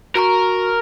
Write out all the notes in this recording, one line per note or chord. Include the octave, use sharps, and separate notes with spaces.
F#4 A#4 A#5 C#6